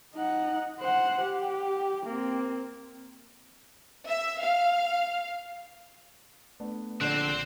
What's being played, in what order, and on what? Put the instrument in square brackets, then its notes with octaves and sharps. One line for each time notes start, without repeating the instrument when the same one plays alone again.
[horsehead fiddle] D#4 F#5
C5 F#5
G4
A#3 C4
[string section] E5
F5
[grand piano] A3 B3 D4
[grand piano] A#1 F#5 F#7 [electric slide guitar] D3 [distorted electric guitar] C4 C5 [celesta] D5 F#6